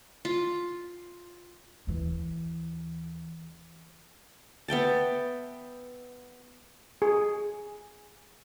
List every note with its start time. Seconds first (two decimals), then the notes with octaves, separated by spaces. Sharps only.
0.25 F4
1.87 D#2 E3
4.68 B3 E5 G5 A5
7.02 G#4